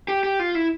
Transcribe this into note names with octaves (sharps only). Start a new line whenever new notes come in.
G4
G4
F4
E4